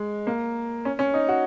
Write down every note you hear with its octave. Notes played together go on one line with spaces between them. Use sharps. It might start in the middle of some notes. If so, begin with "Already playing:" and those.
Already playing: G#3
A#3
C#4
C#4
D#4
F#4